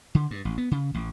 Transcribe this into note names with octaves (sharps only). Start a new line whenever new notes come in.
D3
G2
A1
B3
C#3
A1